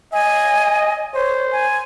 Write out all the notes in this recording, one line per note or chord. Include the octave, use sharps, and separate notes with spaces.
D#5 G#5
C5 C#5
G#5